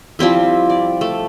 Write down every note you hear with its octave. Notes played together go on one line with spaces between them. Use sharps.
F3 G3 C4 E4
D5
A3